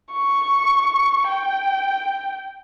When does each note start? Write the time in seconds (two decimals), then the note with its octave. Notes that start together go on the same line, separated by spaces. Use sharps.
0.12 C#6
1.28 G5